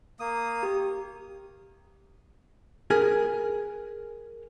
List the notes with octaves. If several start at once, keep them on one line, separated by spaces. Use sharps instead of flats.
A#3 D#6
G4
G#4 A#4 B4